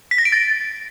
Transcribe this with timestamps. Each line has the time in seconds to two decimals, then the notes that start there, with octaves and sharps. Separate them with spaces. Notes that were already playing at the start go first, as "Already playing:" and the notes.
0.11 B6
0.18 A#6
0.25 D7
0.32 A6